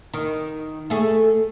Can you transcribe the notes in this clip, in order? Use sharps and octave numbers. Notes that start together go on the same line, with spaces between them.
D#3
A3 G#4